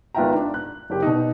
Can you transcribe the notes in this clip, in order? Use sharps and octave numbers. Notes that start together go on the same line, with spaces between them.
G#1 B3 F4 E5 G5 A#5
D4
F#6
F#1 G4
B2 D#4